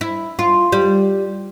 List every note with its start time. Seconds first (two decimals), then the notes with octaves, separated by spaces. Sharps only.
0.01 E4
0.39 F4
0.72 G3